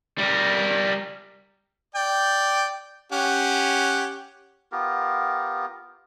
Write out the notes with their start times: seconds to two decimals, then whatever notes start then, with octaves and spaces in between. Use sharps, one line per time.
0.18 G3 A#4
1.95 D5 G5
3.12 C#4 G4 F#5
4.72 B3 F4 G4 A#4